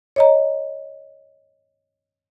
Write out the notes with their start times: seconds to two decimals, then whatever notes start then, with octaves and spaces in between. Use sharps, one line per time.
0.16 C#5 D#5 A#5